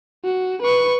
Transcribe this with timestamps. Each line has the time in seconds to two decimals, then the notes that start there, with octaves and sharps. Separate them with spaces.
0.24 F#4
0.62 B4 C#6